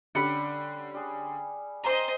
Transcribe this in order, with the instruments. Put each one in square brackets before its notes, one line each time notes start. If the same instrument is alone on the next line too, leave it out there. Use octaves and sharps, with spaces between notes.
[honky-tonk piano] D3 C#4 G4 [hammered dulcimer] G3 F#5 [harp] B5 C#7
[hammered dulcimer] G3 G#4
[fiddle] C5 D#5 [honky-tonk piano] A#5 C6